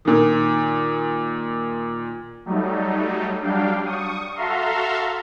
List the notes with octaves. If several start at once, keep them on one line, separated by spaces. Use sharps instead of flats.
A#2 D#3
F#3 G3 A3 D#4
F#3 G3 D4 F5 G5
C#6 D#6
F#4 A4 E5 F5 A#5 C6